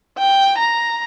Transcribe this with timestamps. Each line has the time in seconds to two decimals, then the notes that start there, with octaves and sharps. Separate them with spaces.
0.18 G5
0.58 A#5